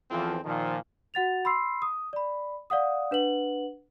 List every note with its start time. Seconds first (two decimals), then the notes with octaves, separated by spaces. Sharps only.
0.10 E2 E3 F3 C4 F4 A4
0.44 A#2 D#3 F3
1.14 F#4 F#5 A6 F7
1.45 B5 C6 E6 C7
1.82 D#6
2.13 D5 B5
2.70 D5 F5 F#5 D#6
3.11 D4 B4 F#5 F#7